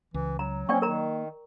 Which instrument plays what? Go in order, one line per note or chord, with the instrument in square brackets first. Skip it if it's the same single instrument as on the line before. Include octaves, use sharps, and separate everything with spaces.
[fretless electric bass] C#2 [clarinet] E3
[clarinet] F#3 [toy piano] A#5
[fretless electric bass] A#3 [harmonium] C4 C#4 [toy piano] D5 G5 C#6
[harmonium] D#3 [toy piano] A#4 A#5